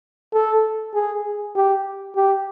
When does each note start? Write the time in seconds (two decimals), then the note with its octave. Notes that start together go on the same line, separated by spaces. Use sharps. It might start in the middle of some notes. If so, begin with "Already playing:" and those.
0.34 A4
0.94 G#4
1.55 G4
2.16 G4